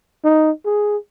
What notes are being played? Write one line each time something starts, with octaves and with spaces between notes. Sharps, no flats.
D#4
G#4